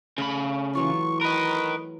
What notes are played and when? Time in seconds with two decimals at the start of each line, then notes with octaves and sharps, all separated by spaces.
0.18 C#3 A3 B5
0.75 E3 F#3 F4 C#6
1.21 A#4 B4 D#5